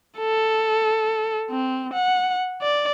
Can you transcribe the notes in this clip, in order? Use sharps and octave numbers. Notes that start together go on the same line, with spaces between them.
A4
C4
F#5
D5